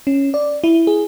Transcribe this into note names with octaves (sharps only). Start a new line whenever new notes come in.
C#4
D5
E4
G#4